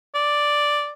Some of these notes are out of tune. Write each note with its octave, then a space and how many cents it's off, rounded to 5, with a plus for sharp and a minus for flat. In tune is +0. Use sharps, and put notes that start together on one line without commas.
D5 +0